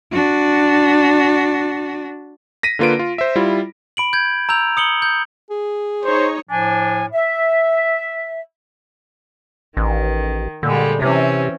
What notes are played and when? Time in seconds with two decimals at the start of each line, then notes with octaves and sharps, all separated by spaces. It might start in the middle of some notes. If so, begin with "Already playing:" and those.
0.12 D4 F#4
2.63 A#6 B6 D#7
2.79 D3 A#3 F4 B4 D7
2.99 F4
3.18 C5 E5
3.36 G3 E4 F4
3.97 B5 D7 F#7
4.13 G6 G#6
4.49 A#5 E6 G6 F7
4.77 D#6 C#7 F#7 G7
5.02 G6
5.50 G#4
6.04 D#4 C5 C#5
6.49 A2 F3 D4 G#5
7.12 E5
9.77 A1 D#3
10.63 A#2 D3 G3 G#3
11.02 C3 E3 C4 C#4